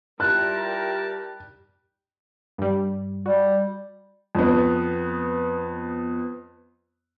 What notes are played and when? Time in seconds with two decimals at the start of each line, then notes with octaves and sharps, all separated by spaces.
0.20 G3 E4 F4 G4 A#4 A5 F#6
2.58 G2 G3
3.26 G3 F#4
4.35 F2 B3